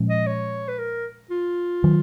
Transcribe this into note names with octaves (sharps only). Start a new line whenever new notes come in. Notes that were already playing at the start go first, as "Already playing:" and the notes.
Already playing: A#2 F3 G#3 C#4
D#5
C#5
B4
A#4
F4
D#3 F#3